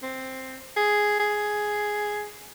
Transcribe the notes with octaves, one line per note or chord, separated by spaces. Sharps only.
C4
G#4
G#4